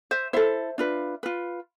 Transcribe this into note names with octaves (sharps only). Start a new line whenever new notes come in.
C5 E5
E4 A4 C5 E5
D4 F4 B4
F4 B4